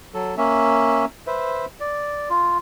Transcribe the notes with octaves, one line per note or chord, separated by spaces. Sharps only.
F#3 A4
A#3 C#4 E5
B4 C5 E5
D5
F4